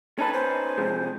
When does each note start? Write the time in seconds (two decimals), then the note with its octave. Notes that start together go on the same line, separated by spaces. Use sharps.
0.19 C#4 D#4 B4 A5
0.33 C5
0.78 C3 F3 G#3